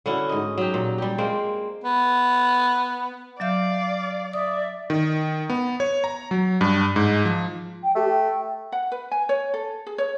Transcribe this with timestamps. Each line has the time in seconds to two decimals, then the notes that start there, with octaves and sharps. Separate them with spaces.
0.06 D3 C#4 E4 F#4
0.29 G#2 D#5
0.58 F#3 G4
0.74 A#2
0.98 G3 G4
1.18 G#3 A#3 C4
1.84 B3
3.40 F#3 D5 E5 F5 G6
4.33 D5 E5 D#6
4.90 D#3
5.50 B3
5.80 C#5
6.04 A#5
6.31 F#3
6.61 G2
6.96 G#2
7.25 F3
7.83 G5
7.95 A3 G4
8.08 G5
8.72 F#5
8.92 B4
9.11 G#5
9.29 C#5
9.54 A4
9.87 G#4
9.98 C#5